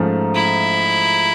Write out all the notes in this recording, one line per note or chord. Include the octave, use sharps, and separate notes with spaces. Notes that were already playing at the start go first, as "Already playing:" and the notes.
Already playing: G#2 F3 A3 C#4
E4